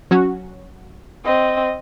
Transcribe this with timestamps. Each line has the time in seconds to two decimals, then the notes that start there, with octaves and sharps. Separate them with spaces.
0.11 F#3 C#4 F#4
1.25 C4 D#5